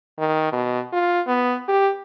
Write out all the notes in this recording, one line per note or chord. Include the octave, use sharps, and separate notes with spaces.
D#3
B2
F4
B3
G4